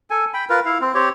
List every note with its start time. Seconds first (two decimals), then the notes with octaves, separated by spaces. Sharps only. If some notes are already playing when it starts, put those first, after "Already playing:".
0.10 A4 G#5
0.34 G5 B5
0.50 F4 A#4 B4
0.65 E4 F5
0.81 C4
0.95 C4 G4 C#5